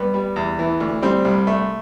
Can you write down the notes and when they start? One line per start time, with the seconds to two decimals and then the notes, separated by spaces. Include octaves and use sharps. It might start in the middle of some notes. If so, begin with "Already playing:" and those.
Already playing: G2 B3
0.14 G3
0.36 E2
0.59 E3
0.80 D2
1.02 G3 C4
1.25 C2
1.47 A3